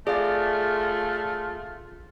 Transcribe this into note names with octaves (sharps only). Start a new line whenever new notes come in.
A3 F4 G#4 D5 F5